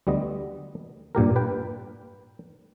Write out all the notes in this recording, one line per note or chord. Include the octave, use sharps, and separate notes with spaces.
D2 G3 B3 D#5
G2 A#2 G4 A#4
B4 G5